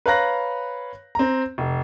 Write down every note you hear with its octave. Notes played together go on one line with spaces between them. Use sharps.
B4 C#5 F5 A#5 F#6 A#6
C4 A#5
F1